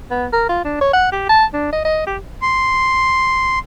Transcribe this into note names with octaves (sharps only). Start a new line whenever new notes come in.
B3
A#4
F4
D4
C#5
F#5
G4
A5
D4
D#5
D#5
G4
C6